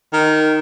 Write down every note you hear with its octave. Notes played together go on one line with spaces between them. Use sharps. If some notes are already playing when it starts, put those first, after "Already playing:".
D#3